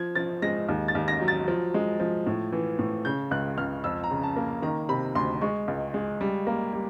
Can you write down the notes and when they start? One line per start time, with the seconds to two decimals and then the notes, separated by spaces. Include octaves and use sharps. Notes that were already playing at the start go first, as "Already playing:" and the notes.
Already playing: F3 G#6
0.15 F3 A6
0.42 G#3 A#6
0.68 D#2
0.88 A6
0.95 D#2
1.08 A#6
1.21 F#3
1.28 A6
1.48 F3
1.74 G#3
2.00 F3
2.27 A2
2.52 E3
2.79 A2
3.05 C#3 G6
3.31 C#2 F#6
3.58 C#2 F6
3.84 F2 E6
4.04 A#5
4.10 C#3
4.23 A5
4.36 A#3
4.62 D#3 A#5
4.89 C3 B5
5.15 D2 C6
5.41 G#3 C#6
5.68 C#2
5.94 G#3
6.21 G3
6.47 A#3
6.73 G3